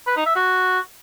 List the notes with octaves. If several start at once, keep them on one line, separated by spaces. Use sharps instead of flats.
B4
D#4
E5
F#4